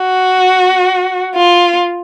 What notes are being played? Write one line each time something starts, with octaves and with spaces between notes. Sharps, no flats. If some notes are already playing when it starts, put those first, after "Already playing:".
Already playing: F#4
F4